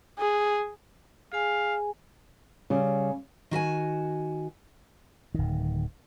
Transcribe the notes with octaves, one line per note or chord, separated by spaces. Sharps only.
G#4
G#4 F5 G#5
C#3 G3
D#3 F#4 E5 G#5
D1 D#3